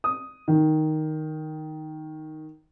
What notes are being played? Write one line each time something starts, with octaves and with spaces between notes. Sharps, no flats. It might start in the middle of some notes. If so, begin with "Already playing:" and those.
D#6
D#3